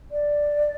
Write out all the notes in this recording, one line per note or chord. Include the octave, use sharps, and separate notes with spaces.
D5